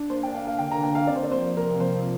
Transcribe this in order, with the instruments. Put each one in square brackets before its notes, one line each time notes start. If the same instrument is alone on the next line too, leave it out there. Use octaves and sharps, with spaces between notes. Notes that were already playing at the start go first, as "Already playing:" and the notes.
Already playing: [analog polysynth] D4
[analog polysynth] A#3 [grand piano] C5
[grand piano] G5
[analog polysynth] A#3 [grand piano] F5
[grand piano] F5
[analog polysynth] D3 [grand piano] G5
[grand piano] A#5
[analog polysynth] A#3 [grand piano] G5
[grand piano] F5
[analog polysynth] C4 [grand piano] D5
[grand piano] C5
D5
[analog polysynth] F3 [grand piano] C5
[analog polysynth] C3 [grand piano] A#4
[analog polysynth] F3 [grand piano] C5